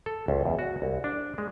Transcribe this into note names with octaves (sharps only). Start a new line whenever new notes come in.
A4
C#2
E2
F#4
C2
D4
G#3